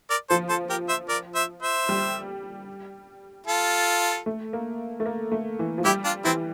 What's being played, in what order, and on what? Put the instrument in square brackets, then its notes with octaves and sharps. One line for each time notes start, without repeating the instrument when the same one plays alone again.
[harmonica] A#4 D5
[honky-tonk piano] F3 [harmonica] A4 C5
[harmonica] A4 C5
G4 A#4
C5 E5
A#4 D5
C5 E5
C5 E5
[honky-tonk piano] G3
[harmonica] F4 A4
[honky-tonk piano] A3
A#3
A3
A#3
A3
E3
F3
[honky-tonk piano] G3 [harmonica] E4 G4
[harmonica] D4 F4
[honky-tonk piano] E3 [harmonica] C4 E4